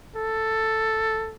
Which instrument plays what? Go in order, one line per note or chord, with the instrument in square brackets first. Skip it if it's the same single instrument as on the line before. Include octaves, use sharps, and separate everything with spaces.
[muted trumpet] A4